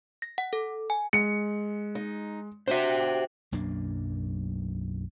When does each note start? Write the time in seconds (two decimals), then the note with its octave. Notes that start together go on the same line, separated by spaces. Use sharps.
0.22 A#6
0.38 F#5
0.53 A4
0.90 G#5
1.13 G#3 C#7
1.95 D#4
2.68 D4 F#4 G4 C5 E5
3.52 B1 F#2 A#3 D4